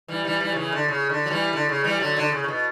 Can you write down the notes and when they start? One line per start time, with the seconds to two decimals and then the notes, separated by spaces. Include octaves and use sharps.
0.08 E3 G3
0.25 E3 G3
0.40 E3 G3
0.52 F#3
0.56 C#3 E3
0.72 D3
0.88 C#3
1.10 D3
1.26 F#3
1.31 E3 G3
1.53 D3
1.69 C#3
1.84 E3 G3
2.00 D3 F#3
2.17 D3
2.32 C#3
2.44 C#3
2.48 B2